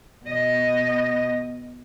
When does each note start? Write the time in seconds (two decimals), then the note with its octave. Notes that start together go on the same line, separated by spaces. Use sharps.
0.25 B2 D#5